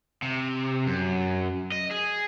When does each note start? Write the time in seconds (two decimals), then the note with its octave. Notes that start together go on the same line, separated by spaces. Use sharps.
0.22 C3
0.87 F#2
1.72 D#5
1.91 G#4